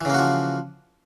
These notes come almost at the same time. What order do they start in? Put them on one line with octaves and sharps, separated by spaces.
E3 C#3 A#3 F#4 F3